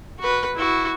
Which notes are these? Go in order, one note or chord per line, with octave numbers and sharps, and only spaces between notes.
F#4 B4
E4 F#4